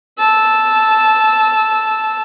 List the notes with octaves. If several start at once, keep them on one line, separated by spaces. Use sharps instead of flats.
A5 E6